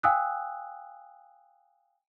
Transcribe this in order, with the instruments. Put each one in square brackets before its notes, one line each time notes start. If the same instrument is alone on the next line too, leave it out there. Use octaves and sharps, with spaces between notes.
[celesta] F5 G5 G#5 D#6 E6 F#6